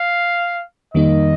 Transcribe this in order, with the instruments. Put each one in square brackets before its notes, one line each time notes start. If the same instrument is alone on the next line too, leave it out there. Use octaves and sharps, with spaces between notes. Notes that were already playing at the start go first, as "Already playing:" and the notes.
Already playing: [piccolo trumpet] F5
[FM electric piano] F2 D#3 G3 A#3 D#4 [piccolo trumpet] D#5